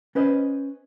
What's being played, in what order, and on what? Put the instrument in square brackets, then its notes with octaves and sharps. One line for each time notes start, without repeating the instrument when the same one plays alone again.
[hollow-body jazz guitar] C#4 B4 C5 D#5